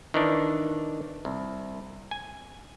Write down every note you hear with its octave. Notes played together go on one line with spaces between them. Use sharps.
D#3 E3 D4
C2
G#5